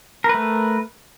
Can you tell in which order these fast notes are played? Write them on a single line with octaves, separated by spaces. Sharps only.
A#4 B4 A3